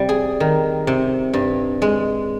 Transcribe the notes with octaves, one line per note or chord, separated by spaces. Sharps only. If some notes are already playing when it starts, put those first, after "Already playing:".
Already playing: C3 G3
G#4
D#3
C3
G2
G#3